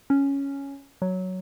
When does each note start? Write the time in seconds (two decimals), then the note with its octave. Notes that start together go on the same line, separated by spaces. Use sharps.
0.10 C#4
1.02 F#3